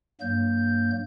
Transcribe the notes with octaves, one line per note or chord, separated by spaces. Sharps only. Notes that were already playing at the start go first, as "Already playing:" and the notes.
G2 F#3 A#3 G6